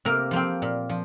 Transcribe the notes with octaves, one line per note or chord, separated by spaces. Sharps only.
C3 A#3 A#4
F3 A#3 C4 C5
A#2
F3